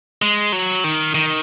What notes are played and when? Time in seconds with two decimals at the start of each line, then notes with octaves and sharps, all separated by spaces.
0.22 G#3
0.52 F#3
0.84 D#3
1.15 D#3